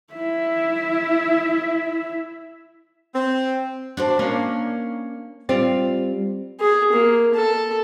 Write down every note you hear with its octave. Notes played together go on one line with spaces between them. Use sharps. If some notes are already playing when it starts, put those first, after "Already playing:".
E4 E5
C4
D4 F#4 C5
A#3 C#4 D4
G3 C4 F4
G#4
A#3
A4